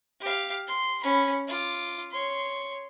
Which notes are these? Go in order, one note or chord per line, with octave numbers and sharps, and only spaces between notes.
G4 F5
C6
C#4 B5
F4 D6
C#5 C6